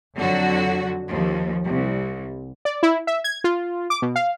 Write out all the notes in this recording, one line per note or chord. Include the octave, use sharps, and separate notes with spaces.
F2 D3 F#3 F#4
D#2 F3
C2
D5
E4
E5
G#6
F4
D6
B2
F5